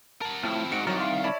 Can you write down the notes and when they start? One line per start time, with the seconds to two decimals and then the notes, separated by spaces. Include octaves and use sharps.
0.21 A#4 F#5 A5
0.43 A2 F3 C4 E4 F6
0.72 G#2 F#4 D5 C#7
0.87 C2 D#3 F#3 A#5 F6 A6
1.00 F5 C6
1.24 E4 C#5 D5 A5 B5